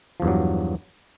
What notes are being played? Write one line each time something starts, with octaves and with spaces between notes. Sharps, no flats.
E2 G2 F3 F#3